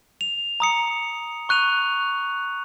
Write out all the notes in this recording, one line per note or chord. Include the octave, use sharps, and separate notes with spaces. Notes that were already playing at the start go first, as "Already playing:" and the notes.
F7
A#5 D#6 C#7
C#6 F#6 D#7 F7